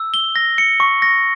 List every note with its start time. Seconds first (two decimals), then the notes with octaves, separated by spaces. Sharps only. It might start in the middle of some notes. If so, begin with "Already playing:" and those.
Already playing: E6
0.14 G7
0.36 A#6
0.58 C#7
0.80 C#6
1.02 A#6